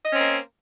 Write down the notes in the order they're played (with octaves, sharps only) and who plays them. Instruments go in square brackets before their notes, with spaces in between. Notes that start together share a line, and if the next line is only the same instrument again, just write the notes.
[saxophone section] D#5
C#4
C4
A#3